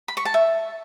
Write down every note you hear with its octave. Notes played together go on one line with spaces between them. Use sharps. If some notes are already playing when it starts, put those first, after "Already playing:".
B5
C#6
A5
E5